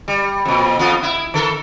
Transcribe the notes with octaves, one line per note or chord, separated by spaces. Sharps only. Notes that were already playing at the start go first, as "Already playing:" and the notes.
G3
F2 A#2
E2 B3 F4
E4
D#3 A4 A#4